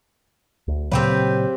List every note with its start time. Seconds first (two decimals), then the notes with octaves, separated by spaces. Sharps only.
0.68 D2
0.91 A#2 C#3 F#3 C4 G4 B4